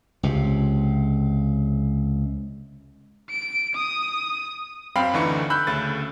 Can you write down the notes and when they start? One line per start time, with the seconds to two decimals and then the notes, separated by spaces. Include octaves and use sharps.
0.23 C#2 C3
3.30 D7
3.75 D#6
4.96 F#2 C4 F5 G5 B5
5.13 D2 D3 E3 D#4 C#6 C#7
5.50 B5 E6 F#6 G6
5.67 D2 C#3 A3 A6